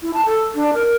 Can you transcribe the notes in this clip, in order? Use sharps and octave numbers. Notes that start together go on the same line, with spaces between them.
E4
A5
A4
D4
A#4